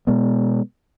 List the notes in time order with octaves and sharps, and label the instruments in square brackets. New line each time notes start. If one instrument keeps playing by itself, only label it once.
[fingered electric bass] B2 G#3 B3